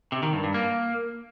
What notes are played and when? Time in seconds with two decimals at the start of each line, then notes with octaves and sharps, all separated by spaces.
0.12 C3
0.23 D#3
0.33 G2
0.44 G2
0.54 A#3